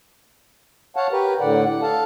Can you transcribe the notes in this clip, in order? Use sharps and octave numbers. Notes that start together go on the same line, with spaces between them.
C#5 F5 F#5 A5
G4 A#4 B4
A2 D3 D5 F#5
F#5
A4 F5 A5